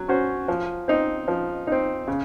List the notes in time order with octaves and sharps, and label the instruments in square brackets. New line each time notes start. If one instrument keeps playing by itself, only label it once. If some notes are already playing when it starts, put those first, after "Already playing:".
Already playing: [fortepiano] F#3
C#4 F#4 C5
F3
C4 D#4
F3
C4 D#4
C#3